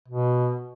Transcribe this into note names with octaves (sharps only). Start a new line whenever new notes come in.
B2